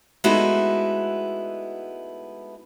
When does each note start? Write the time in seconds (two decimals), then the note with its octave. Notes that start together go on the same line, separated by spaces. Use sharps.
0.24 G#3 A3 B3 D#4 E4 F#4